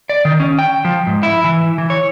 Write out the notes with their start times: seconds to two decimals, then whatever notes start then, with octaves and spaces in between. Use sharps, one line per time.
0.10 D5
0.25 D#3
0.40 C#4
0.59 G5
0.85 F3
1.07 G#2
1.23 E4
1.44 E3
1.78 E3
1.90 C#5